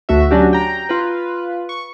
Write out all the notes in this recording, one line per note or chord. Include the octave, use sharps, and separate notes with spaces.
D2 A3 F#4 E5
F#3 C#4 D4 F#4 G4
G5 A#5
F4 B4
C#6